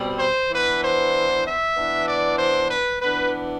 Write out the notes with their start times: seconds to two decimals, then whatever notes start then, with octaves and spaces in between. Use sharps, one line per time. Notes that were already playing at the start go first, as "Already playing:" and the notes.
Already playing: B2 G3 C4
0.19 C5
0.51 E3 B3 D4 B4
0.82 C5
1.44 E5
1.75 E3 B3 D4
2.06 D5
2.36 C5
2.68 B4
2.99 E3 B3 D4 B4